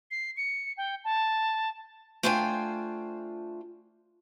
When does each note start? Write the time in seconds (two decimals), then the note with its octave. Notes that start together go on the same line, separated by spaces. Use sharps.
0.11 C7
0.37 C#7
0.77 G5
1.04 A5
2.23 A3 D4 F4 C5 G5 G#5